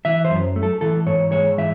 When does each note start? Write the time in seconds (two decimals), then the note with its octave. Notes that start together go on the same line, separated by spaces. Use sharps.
0.05 E3 E5
0.25 C5
0.30 F#2
0.56 A3
0.63 A4
0.81 E3 A4
1.06 G#2 C#5
1.32 G#3 C#5
1.58 E3 E5